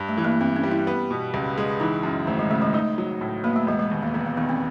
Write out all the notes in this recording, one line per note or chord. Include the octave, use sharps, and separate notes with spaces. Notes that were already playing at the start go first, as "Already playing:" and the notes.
Already playing: G2
A3
E3
A#3
G2 C4
C#4
G3
E4
B3
B2
C#2
G#3
E3 D#4
F#2
G#1 A3
G#3
C#3 A3
G#3
A3 D#4
F#3
A2
A#3 B3
A3
E1 G#3
G#3
D#2
A#3
E1 B3
B3
D#3 B3
C4